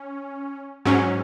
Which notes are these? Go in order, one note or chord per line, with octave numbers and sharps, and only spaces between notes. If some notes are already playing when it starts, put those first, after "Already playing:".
Already playing: C#4
G#2 F#3 C#4